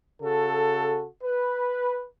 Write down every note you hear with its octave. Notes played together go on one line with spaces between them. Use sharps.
C#3 F#4 A4
B4